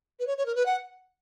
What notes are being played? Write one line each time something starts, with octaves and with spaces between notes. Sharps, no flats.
B4
C#5
C#5
A#4
B4
F#5